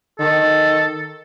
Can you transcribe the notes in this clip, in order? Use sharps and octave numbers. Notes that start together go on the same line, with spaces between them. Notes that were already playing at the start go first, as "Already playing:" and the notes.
D#3 A4